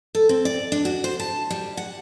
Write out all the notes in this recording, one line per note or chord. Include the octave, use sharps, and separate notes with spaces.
A4
C4
D5
D4
F#4
C5
A5
G3
F#5